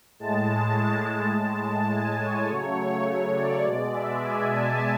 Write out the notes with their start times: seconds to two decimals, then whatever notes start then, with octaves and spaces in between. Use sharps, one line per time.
0.19 A2 G#3 A5
1.34 A2 G#3 A5
1.92 G#5
2.20 C#5
2.49 C#3 F#3 A3 C#5
3.06 C#5
3.35 D5
3.64 B2 G#3 D5
3.92 E5
4.21 G#5
4.50 A5